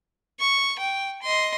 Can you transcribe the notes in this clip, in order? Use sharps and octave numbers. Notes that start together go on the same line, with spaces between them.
C#6
G5
D#5 C6